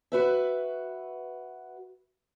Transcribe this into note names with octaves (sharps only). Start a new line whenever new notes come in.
F#4 B4 E5